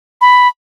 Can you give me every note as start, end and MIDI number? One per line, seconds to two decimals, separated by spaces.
0.21 0.48 83